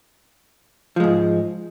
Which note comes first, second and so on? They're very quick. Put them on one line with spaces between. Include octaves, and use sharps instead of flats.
F3 G#3 G#2